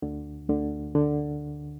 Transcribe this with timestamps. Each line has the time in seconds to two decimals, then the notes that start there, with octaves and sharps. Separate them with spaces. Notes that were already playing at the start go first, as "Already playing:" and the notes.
0.02 D2 D3
0.49 D2 D3
0.95 D3